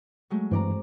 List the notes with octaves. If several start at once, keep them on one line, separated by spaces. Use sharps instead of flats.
F#3 G#3 A3
G2 E3 C4 D5 A#5